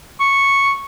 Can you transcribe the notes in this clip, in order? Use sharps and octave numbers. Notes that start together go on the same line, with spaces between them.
C#6